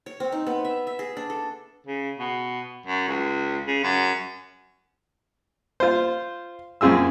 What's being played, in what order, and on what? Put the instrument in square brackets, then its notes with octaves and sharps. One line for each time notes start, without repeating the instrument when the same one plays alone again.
[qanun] C#5
C4
D#4
B3
E5
E5
G#4
D4
A4
[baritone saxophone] C#3
B2
F#2
C#2
C#3
F#2
[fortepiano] F4 C5
F#2 C4 F4 G#4 E6